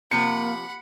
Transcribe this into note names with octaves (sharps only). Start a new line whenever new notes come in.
C3 F3 A#3 G4 F#5 B5 C#7